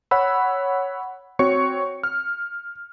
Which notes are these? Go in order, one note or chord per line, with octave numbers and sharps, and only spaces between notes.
C#5 F#5 B5 E6
C4 F#4 C#5 C#6 C#7
F6